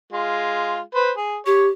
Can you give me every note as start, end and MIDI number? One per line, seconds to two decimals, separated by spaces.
0.13 0.80 56
0.13 0.80 65
0.95 1.11 71
0.95 1.11 72
1.17 1.37 68
1.46 1.68 67
1.46 1.65 73